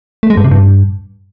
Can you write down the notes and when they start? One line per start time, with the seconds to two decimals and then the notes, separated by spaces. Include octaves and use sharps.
0.23 A3
0.30 G#3
0.37 G2
0.44 C3
0.51 G2